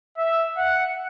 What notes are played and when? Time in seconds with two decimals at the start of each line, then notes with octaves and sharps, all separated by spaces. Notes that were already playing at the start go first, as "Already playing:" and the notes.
0.18 E5
0.57 F#5